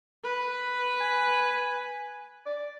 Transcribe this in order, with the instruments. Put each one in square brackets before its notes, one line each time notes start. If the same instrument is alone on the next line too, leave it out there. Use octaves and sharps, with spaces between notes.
[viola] B4
[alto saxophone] G#5
D5